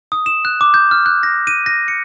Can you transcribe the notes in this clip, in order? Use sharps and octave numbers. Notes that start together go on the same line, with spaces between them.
D#6
E7
F#6
D6
G6
F6
F#6
A#6
D#7
A#6
C#7